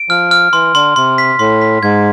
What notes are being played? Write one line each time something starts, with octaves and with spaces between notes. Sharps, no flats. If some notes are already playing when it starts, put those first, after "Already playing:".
Already playing: D7
F3 F6
F6
E3 C6
D3 C6
C3 C6
B6
A2 C6
B6
G#2 G#6